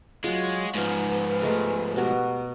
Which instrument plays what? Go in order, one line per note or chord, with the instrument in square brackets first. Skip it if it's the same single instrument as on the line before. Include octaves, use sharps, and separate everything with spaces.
[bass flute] F#3 [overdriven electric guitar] G#3 [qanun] F4 F#4 C#5
[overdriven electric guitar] G#2 F3 [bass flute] B4
[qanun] G#3 A3 A#4
[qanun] B2 F#4 A#4 [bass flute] G4